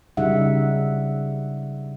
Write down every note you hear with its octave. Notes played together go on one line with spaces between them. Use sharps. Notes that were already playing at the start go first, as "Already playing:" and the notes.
C#3 G3 D#4 G#4 E5 F#5